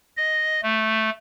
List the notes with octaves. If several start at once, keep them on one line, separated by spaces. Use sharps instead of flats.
D#5
A3